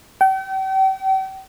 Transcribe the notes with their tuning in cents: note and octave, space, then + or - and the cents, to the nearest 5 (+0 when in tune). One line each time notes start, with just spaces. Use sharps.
G5 -40